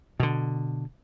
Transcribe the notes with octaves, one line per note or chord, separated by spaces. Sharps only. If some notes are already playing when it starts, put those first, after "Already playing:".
B2 D3